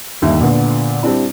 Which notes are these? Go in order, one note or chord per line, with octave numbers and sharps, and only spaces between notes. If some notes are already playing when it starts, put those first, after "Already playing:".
G1 D#2 D#3 E5
A#2 D3 B3
G3 C4 D4 E4